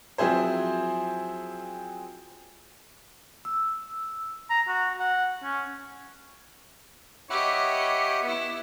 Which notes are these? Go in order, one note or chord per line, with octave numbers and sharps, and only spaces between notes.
F3 F#3 C4 E4 G#4 C5
E6
A#5
F#4
F#5
C#4
G4 C#5 D#5 E5 F#5 B5 D6
B3 E4